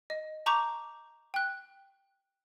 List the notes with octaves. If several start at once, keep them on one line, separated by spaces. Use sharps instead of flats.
D#5
A5 A#5 C#6 D6 G6 F7
G5 F#6